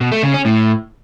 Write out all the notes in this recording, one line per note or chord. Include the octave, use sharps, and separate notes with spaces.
B2
A3
C#3
C#4
A2